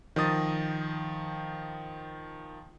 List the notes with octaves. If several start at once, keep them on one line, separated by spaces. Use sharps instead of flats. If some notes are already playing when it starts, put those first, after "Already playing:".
D#3 F3 D#5 D#6 A6